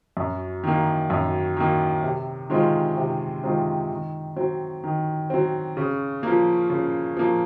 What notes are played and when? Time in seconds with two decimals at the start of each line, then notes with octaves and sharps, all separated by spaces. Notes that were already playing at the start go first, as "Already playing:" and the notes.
0.17 F#2
0.64 D#3 A#3
1.10 F#2
1.57 D#3 A#3
2.03 C3
2.50 D#3 G#3 C4 F4
2.97 C3
3.43 D#3 G#3 C4 F4
3.90 D#3
4.36 F#3 C4
4.84 D#3
5.30 F#3 C4
5.77 C#3
6.23 F3 A#3
6.70 C#3
7.17 F3 A#3